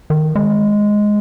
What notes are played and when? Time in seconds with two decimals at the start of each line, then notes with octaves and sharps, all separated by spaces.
0.10 D#3
0.35 G#3